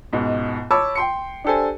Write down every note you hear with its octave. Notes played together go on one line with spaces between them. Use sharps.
C#2 G#2 B2
C#5 A5 B5 D6 E6
G5 C6 C#7
D4 G4 A4 C5 G#5